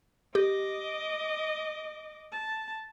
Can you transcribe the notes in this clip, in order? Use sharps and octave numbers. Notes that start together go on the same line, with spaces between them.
G4 D#5 D6
A5